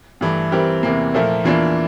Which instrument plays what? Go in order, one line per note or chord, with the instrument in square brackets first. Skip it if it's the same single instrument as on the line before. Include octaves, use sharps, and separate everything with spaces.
[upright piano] G2 E3 A3
E3 G3 C4 G4 A#4
E2 C3 E3 A#3
A#2 F3 A3 E4 A#4
E2 E3 A#3 D4 F4